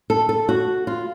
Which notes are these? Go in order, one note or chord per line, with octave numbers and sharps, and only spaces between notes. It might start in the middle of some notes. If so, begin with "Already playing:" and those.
A4
A4
F#4
F4